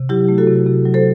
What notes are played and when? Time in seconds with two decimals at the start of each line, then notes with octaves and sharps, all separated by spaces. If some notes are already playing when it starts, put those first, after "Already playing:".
Already playing: C3
0.09 F#3 E4 G4
0.28 A3
0.38 F#4 A4
0.47 C3
0.66 C3
0.86 F#3
0.94 A4 C5